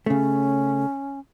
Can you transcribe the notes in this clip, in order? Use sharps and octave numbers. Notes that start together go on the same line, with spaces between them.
C#3 A3 C#4